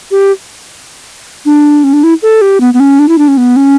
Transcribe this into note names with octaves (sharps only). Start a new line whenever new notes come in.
G4
D4
C#4
D4
E4
A4
G4
B3
B3
C#4
D4
E4
D4
C#4
B3
C#4